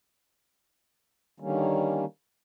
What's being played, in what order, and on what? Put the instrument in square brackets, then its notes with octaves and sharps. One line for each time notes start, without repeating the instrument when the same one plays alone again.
[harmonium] D3 D#3 G3 A#3 C#4